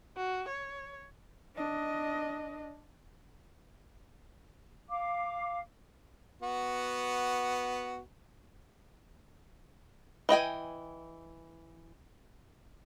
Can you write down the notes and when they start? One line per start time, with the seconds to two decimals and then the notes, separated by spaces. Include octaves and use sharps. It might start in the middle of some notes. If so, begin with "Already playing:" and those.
0.16 F#4
0.48 C#5
1.55 D4 D#5
4.88 F5 D6
6.42 B3 F#4
10.29 E3 D#5 G5 G#5